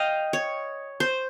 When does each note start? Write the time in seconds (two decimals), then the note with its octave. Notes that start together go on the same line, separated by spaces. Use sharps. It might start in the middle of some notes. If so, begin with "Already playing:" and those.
Already playing: D#5 F5 G5
0.33 C#5
1.00 C5